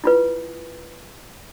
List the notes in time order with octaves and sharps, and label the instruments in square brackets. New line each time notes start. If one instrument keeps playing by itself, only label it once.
[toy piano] E4 F4 B4